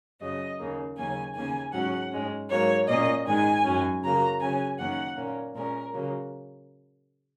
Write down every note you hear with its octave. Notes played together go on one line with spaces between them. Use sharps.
F#2 C#3 F#3 D#5
D#2 C#3 A#3
D#2 C#3 F#3 A#3 C#4 G#5
D#2 C#3 A#3 C#4 G#5
G#2 F#3 C#4 F#5
G#2 G#3 C#4
G#2 F#3 A#3 C#5
A#2 A#3 C#4 D#5
G#2 D#3 G#3 G#5
F#2 F#3 C#4
C#3 F#3 A#3 A#5
C#3 F#3 C#4 G#5
F#2 D#3 A#3 C#4 F#5
A#2 A#3 C#4
A#2 G#3 C#4 A#4
C#3 F#3 A#3 C#4